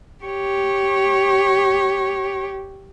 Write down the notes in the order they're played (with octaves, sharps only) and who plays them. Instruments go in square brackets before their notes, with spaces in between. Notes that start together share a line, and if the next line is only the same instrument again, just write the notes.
[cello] G4 C#5